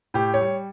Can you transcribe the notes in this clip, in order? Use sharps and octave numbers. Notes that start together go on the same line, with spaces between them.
A2 G4
C#5
G3